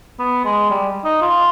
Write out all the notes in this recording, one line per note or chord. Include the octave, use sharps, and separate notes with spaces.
B3
G#3
G3
D#4
F4